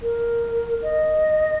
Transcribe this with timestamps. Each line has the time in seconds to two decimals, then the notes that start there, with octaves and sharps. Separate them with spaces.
0.03 A#4
0.83 D#5